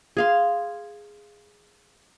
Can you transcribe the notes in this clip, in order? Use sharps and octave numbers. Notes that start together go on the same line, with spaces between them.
G#4 F5 C6